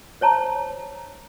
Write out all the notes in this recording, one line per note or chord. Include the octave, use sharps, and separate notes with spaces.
C5 C#5 A5 A#5